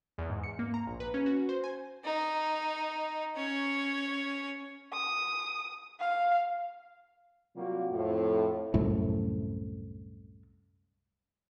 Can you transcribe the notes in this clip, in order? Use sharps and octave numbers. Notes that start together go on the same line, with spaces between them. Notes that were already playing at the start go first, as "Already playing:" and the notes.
E2
G#2
C#7
A#3
A#5
A#1
B4
C#4
F#4
C5
G#5
D#4
C#4 C#5
D#6
F5
C3 F#3 G3 A#3 F4 F#4
F2 A2
C2 F#2 A2